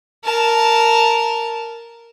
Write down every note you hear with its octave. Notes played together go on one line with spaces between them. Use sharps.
A#4 A5